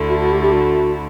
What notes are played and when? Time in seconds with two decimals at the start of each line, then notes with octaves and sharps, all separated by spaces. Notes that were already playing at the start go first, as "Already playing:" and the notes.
Already playing: D2 D3 A3 E4
0.09 F#4
0.19 F#4
0.31 G4
0.42 G4
0.52 F#4